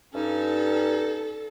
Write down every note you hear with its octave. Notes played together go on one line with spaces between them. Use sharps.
G2 C#4 D#4 A4